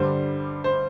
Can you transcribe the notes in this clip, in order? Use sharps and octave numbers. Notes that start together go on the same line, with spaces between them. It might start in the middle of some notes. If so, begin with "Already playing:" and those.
Already playing: G2 D3 G3 C5
C5